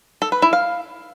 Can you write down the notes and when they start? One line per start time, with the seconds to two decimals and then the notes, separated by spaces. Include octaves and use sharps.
0.22 A4
0.32 B4
0.42 E4
0.53 F5